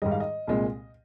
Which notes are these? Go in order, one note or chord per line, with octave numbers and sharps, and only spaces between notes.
G#2 D#3 G3 D#5
F5
D#5
C2 A#2 G#3